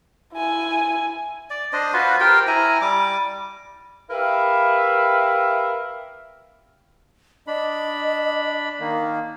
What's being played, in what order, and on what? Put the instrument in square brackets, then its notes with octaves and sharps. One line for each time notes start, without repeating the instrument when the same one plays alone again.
[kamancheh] E4 G#5
[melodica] D5
D4 C5 D#5
F4 F#4 B4 C5
G4 A#4 C5 G5
E4 G#5 A#5
G3 D6
[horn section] E4 G4 A#4 B4 E5 F5
[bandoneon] D4 B5 [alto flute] D#5
[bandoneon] D#3 A#3